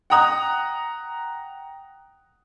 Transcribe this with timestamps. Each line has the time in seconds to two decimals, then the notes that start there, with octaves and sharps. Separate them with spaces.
0.10 F#5 G5 A#5 D#6 F#6